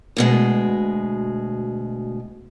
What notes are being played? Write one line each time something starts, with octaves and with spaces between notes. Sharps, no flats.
D2 B2 G#3